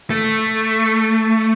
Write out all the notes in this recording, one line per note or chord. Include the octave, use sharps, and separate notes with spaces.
A3